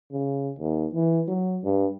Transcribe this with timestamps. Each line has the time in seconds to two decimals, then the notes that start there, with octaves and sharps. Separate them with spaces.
0.12 C#3
0.59 D#2
0.93 E3
1.28 F#3
1.64 G2